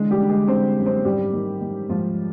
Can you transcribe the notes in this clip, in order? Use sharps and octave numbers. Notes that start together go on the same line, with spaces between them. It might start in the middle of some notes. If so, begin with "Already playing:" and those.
Already playing: D3 E3 G#3 G#4
G3 G4
D3
G#3 G#4
D3 C4 C5
F#2
C4 C5
G#2 G3 G4
D#3
D#3
G#2 F3 F4